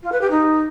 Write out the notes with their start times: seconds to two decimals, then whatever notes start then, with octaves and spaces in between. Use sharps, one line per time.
0.03 F4
0.12 B4
0.21 G4
0.31 D#4